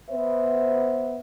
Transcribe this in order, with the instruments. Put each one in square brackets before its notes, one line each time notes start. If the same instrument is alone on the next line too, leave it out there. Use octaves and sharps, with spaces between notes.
[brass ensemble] B3 B4 C5 E5